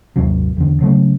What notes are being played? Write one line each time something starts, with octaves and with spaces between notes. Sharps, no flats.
G#1 D#2 C3 F#3
E2 D3
C#3 F#3 A3